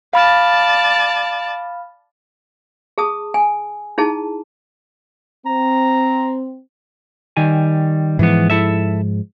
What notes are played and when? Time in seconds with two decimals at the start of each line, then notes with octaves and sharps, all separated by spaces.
0.13 D5 F5 A5 B5 F6
2.98 G#4 A5 D#6
3.34 G#5
3.98 D#4 E4 G#4 A5
5.46 C4 A#5
7.37 D#3 G3 G#5
8.19 G#2 E3 F3 G#3 B3
8.50 E4 A4 E5